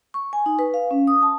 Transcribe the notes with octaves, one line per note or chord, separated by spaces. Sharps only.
C#6
G#5
D#4
B4
F5
C#4
D#6
A5